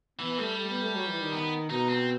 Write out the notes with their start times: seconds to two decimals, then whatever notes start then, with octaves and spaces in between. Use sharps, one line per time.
0.19 E3 B3
0.38 G3 A3
0.57 A3
0.69 B3
0.82 A3
0.95 F#3
1.07 E3
1.20 D#3
1.32 B3
1.70 B2 D#4
1.89 C4